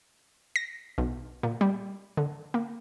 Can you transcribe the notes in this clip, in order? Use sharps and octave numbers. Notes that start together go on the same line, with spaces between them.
A#6
B1
A#2
G3
D3
A#3